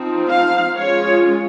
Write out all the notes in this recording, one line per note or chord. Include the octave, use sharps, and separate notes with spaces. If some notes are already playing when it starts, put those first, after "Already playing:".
Already playing: F3 C4 D#4
F5
G#3 C#4 F4 C#5